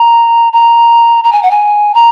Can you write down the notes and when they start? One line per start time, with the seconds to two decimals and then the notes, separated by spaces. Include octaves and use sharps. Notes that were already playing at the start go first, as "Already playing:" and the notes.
Already playing: A#5
0.53 A#5
1.24 A#5
1.32 G#5
1.43 F#5
1.51 G#5
1.94 A#5